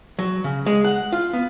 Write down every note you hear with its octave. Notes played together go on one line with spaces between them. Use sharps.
F#3
C#3
G#3
F#5
F4
B3